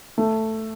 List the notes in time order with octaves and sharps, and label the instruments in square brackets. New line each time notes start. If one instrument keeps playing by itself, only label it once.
[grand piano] A3